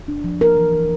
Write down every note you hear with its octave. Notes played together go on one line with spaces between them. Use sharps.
D4
F3
A#3 A#4
E3
E3